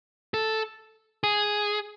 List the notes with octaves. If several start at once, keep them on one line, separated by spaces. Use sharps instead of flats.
A4
G#4